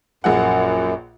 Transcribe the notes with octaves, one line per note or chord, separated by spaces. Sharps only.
A#1 F#2 G#4 F#5